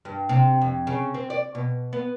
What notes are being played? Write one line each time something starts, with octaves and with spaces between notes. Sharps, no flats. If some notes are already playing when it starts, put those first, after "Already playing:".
G2
C3
F2
C#3
C4
D5
B2
B3